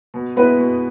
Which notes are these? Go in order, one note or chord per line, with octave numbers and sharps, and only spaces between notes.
B2
G#3 B3 E4 B4
B2